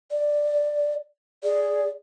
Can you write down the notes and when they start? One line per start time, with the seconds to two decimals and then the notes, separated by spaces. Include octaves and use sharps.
0.12 D5
1.44 G#4 D5